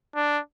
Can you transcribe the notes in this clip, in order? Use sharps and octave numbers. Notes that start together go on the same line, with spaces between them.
D4